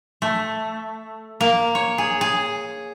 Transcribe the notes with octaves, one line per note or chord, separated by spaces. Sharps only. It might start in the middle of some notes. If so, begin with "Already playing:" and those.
A3
A#3
C#5
G#4
G#4